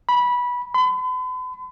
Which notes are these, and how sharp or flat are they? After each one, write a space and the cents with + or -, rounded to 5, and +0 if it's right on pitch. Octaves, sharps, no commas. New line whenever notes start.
B5 -15
B5 +45